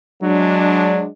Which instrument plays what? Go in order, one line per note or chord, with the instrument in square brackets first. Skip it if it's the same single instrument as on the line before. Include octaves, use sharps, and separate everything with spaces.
[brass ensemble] F#3 G#3 D4